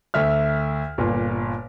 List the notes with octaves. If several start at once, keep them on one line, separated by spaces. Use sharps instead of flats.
D2 A4 E5 F6
G1 A#2